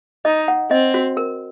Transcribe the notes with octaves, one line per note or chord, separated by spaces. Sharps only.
D#4 D#5
F#5
C4 D#5
F#4
A#4